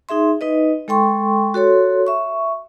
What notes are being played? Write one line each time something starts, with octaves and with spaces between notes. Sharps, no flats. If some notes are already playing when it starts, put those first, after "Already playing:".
D#4 G#4 E5 C6
D#4 B4 D#5
G#3 A4 G5 C6 C#6
F#4 A4 C#5 C6
E5 C#6